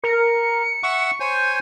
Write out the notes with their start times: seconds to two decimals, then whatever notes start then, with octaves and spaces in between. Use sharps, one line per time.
0.04 A#4 C#7
0.83 E5 F#5 C#6
1.20 C5 C#5 G#5 G6